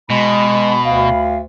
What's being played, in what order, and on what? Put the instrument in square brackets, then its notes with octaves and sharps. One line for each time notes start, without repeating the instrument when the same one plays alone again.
[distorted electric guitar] B2 [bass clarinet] G#3 [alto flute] B5
[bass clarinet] D2 [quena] F5